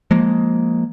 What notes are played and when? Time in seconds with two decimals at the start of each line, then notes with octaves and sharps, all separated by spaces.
0.11 F3 G#3 A#3